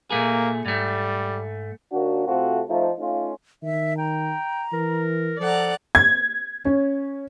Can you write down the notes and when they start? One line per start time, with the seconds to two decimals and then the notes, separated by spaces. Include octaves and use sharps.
0.10 A#2 A3 A#3 G#4
0.66 G#2 G3 A3
1.92 D#2 A#3 D4 F#4
2.27 C3 A3 C4 F4 F#4 A4
2.69 F3 A3 D#4
2.98 A3 C#4 D#4 F4
3.63 D#3 E5
3.98 G5 A#5
4.73 E3 A#4
5.40 F3 A4 D5 F#5 A#5
5.95 G#6
6.65 C#4